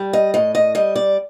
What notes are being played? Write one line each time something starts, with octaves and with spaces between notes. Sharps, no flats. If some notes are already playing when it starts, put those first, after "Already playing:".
Already playing: G3
D#5
A2 D#5
D#5
G3 D#5
D5